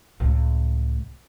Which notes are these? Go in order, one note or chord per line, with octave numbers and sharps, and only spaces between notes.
C#2 A2